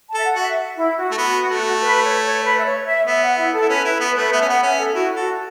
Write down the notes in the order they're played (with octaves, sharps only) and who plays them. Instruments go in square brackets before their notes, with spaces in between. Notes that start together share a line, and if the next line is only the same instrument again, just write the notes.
[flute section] A5
[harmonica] A4 [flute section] E5
[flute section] F#5
[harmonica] F#4 [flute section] E5
[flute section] E4
F#4
[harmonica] A3
B3
A3
[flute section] B4
C#5
C#5
B4
E5
C#5
E5
[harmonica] B3 [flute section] E5
[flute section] F#5
E4
A4
[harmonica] E4
[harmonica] C#4 [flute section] B4
[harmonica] E4
B3
[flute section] B4
[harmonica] A3
[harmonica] B3 [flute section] E5
[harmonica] C#4
[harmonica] B3 [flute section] F#5
[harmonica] C#4 [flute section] E5
[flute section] A4
[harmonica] E4 [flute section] F#4
[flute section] F#4 [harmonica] A4